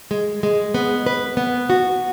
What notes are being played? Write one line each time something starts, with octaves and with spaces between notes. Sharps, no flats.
G#3
G#3
B3
B4
B3
F#4